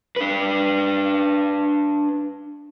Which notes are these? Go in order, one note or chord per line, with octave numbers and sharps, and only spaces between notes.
D4 B4